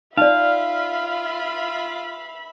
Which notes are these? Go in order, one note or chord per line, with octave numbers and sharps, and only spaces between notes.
D#4 F4 D5 E5 F5 B5